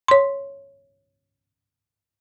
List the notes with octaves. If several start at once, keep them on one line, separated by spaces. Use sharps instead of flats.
C#5 C6